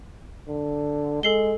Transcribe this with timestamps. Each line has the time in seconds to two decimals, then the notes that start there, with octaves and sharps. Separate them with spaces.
0.49 D3
1.23 G#3 A4 C7 G7